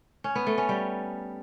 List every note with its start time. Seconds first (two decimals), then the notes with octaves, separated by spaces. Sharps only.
0.24 C#4
0.35 B3
0.47 A3
0.58 C#4
0.69 G3